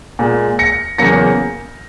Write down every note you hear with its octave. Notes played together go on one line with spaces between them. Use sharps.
A#2 G#3
A#6 C#7
E2 C#3 F#3 A#3 A#6 C#7